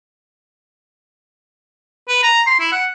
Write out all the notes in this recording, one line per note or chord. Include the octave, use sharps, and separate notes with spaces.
B4
A#5
C6
E4
F#5